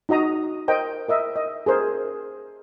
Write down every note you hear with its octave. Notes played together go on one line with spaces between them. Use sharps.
D#4 F#4 D#5 A#5 D#6
A#4 C5 D#5 G5 A#5
A#4 D#5 E5
D#5
G#4 A#4 C5